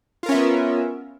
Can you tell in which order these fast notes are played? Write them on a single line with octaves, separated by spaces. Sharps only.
F4 A#4 C#4 E5 B3